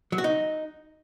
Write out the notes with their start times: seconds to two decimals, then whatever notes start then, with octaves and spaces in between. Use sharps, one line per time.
0.12 F#3
0.18 F#4
0.24 D#4